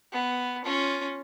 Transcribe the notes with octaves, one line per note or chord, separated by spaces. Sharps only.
B3
C#4 F4